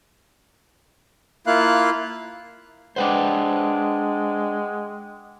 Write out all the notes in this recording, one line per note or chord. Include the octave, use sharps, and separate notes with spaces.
A#3 E4 F4 F5 F#6
G#3 D4 B4 C5 F#5 G5 D6